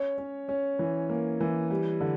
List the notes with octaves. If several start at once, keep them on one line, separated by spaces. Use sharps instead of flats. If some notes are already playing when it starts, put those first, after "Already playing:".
Already playing: C#4 C#5
C#4
C#4
E3
A#3
E3
G3
D3